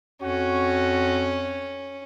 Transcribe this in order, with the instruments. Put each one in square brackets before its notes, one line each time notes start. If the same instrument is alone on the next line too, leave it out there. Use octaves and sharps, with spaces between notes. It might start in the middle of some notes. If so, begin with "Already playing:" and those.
[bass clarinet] F2 [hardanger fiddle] C#4 [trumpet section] F#4